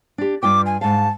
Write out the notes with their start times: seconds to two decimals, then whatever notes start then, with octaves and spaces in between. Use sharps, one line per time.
0.18 D4 G4
0.43 G2 F4 G5 D6
0.66 G#5
0.81 G#2 F5 A5